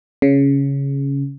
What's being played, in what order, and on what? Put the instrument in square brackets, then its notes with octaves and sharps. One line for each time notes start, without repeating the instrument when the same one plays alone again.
[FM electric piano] C#3